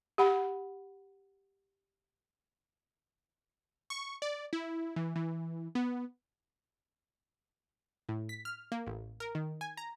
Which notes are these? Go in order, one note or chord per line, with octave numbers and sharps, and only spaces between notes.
G4 F#5 B5
C#6
D5
E4
E3
E3
B3
A2
B6
F6
A#3
A1
A#4
D#3
G#5
A#5